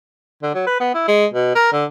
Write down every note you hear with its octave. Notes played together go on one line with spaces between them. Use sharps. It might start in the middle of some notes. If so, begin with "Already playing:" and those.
D3
F#3
B4
B3
E4
G#3
B2
A#4
D3